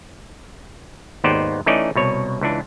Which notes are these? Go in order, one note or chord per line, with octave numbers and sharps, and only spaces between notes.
G#1 D#2 B3 D#4 C5 D5
E3 A3 C#4 D#4 D5 D#5
C2 B2 C#5
C#2 E3 D4